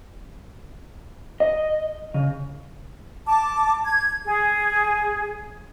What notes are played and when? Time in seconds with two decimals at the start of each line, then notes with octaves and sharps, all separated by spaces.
1.40 D#5
2.14 C#3
3.26 A5 D6
3.85 G#6
4.25 G#4